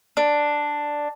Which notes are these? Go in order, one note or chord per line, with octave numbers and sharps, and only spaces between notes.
D4